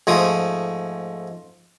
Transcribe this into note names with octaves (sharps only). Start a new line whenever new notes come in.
G#2 F3 A3 D#6